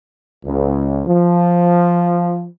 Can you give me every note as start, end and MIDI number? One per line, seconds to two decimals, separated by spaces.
0.45 1.03 37
1.07 2.46 53